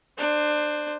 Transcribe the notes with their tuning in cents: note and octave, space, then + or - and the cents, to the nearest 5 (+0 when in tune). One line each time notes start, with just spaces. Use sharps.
D4 +25 C5 +0